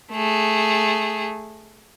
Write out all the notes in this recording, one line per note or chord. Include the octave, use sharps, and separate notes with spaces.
A3 G#4